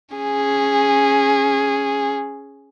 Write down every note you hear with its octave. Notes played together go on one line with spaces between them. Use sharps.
C#4 G#4